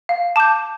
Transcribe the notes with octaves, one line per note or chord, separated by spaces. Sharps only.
F5
A5 D6 G6